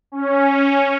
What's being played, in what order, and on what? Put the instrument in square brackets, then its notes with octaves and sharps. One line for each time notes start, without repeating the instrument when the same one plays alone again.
[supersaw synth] C#4